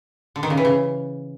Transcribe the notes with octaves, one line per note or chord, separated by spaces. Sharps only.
D3
D#3
C#3
E3
C#3